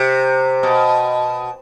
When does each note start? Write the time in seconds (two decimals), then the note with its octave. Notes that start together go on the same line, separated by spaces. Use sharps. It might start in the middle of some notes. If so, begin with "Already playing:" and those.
Already playing: C3
0.63 B2